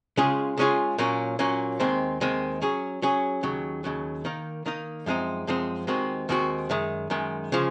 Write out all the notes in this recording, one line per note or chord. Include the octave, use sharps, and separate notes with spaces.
C#3 G#3 C#4 F4 G#4
C#3 G#3 C#4 F4 G#4
A#2 F#3 A#3 C#4
A#2 F#3 A#3 C#4
D#2 D#3 G#3 C4
D#2 D#3 G#3 C4
F#3 C#4 G#4
F#3 C#4 G#4
D#2 C#3 F#3
D#2 C#3 F#3
D#3 A#3 D#4
D#3 A#3 D#4
F#2 F3 G#3 C4 D#4
F#2 F3 G#3 C4 D#4
D#2 D#3 G#3 C4 F#4
D#2 D#3 G#3 C4 F#4
F#2 D#3 G#3
F#2 D#3 G#3
C#3 F3 G#3